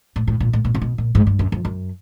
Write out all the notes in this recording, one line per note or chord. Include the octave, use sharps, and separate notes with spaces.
A2
A2
A#2
A2
A#2
C3
B2
A#2
G#2
G2
F#2
F2
F#2